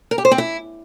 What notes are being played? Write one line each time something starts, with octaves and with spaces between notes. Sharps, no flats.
A#4
G4
C5
C4
E4